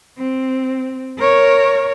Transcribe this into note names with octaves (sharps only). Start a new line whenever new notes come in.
C4
A#4 C#5